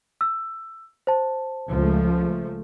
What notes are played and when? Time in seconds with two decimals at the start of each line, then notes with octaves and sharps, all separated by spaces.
0.21 E6
1.07 C5 A5
1.69 C#2 F3 A3